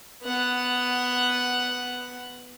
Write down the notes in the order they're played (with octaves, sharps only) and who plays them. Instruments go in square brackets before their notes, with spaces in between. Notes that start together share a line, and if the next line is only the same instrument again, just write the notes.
[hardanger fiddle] B3 F#5